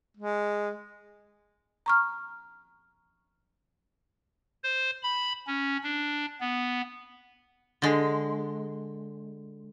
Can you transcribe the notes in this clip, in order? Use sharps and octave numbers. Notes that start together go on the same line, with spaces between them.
G#3
A#5 C#6 F6
C5
B5
C#4
D4
B3
D3 G#3